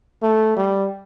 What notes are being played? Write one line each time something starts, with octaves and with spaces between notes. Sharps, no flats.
A3
G3